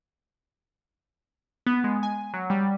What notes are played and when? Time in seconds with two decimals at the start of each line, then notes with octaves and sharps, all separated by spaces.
1.66 B3
1.84 G#3
2.03 G#5
2.34 F#3
2.50 G3